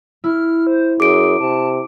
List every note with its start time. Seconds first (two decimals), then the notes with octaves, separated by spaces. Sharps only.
0.24 E4 F6
0.67 C5
1.00 F#2 G#4 D6 D7
1.40 C3 A5